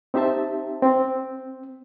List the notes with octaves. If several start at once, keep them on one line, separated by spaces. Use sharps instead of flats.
C4 D#4 G4 C5 E5 A5
C4